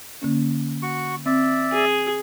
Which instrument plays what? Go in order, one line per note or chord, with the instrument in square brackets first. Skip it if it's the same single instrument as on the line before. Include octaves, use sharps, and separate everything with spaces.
[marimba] D3 A#3 C#4
[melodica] F#4 C#6
[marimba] C4 [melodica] D5 E5
[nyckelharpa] G#4